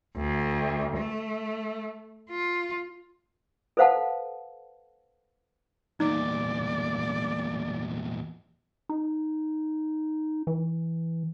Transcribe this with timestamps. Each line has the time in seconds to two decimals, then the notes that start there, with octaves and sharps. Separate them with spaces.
0.17 D2
0.97 A3
2.30 F4
3.77 A4 B4 C5 F5 F#5 A5
6.00 E2 A#2 D#4 D5
8.89 D#4
10.47 E3